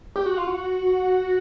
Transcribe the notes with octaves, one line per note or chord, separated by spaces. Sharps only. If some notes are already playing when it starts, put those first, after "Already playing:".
G4
F#4
F4
F#4